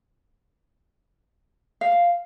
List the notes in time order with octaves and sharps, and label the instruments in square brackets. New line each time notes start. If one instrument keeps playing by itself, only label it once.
[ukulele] F5